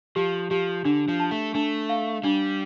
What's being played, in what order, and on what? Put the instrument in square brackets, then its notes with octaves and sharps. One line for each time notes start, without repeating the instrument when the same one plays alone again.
[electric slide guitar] F3 [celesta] G4
[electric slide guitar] F3 [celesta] G4
[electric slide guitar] D3 [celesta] D4
[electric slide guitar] F3
[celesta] A5
[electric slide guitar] A3
[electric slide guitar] A3 [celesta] D4
[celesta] F5
[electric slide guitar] G3 [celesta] D4